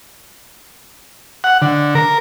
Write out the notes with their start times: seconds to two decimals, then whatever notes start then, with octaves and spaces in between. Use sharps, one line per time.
1.44 F#5
1.62 D3
1.95 A#4